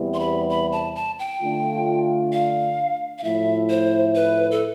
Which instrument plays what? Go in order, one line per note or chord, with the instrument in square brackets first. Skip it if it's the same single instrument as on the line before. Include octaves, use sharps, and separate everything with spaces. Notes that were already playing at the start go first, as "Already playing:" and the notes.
Already playing: [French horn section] E2 C3 G3 B3 E4
[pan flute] C6
B5
B5
A5
A5
G5
[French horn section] D3 A3 D4 F4
[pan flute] F5
F5
[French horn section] A2 F3 A3 E4 [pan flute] E5
[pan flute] C5
B4
A4